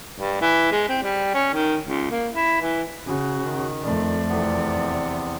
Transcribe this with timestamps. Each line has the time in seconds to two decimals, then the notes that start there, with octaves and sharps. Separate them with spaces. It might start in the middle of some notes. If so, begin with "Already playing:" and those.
0.20 G2
0.41 E3
0.71 G#3
0.88 C4
1.03 G3
1.34 C#4
1.54 D#3
1.87 C#2
2.11 A#3
2.34 E4
2.61 E3
3.07 C#3 F#4
3.45 D#3
3.83 F2 A3 D5
4.29 E2 C3 B3